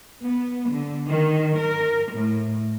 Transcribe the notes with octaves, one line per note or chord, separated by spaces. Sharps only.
B3
D3
D#3
A#4
A2